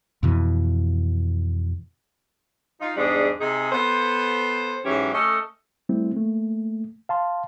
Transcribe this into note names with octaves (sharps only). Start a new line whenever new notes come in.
F2 B2 E3
D#4 F4
E2 G#2 G3 D4 G#4
C3 D#4 G#4
B3 A4 C5
G#2 E3 F#3 C#4 G4
A3 C#4 A4 D#5
G3 A3 C4 E4
A3 A#3
F5 A5 C6